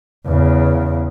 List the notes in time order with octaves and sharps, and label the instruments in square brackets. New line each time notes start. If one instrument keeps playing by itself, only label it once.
[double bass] E2 C#3